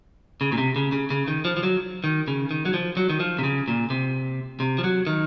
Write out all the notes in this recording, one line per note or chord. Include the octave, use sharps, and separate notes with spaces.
C#3
A#2
C3
C#3
C#3
C#3
D#3
F3
F3
F#3
D#3
C#3
D#3
F#3
F3
F#3
D#3
F3
C3
C#3
A#2
C3
C3
F3
F#3
D#3